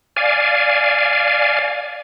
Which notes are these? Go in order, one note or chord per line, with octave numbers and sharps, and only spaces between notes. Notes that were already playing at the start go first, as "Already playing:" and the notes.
D5 F5 G#5